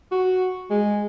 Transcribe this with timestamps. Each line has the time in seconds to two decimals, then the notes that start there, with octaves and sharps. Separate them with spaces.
0.12 F#4
0.70 G#3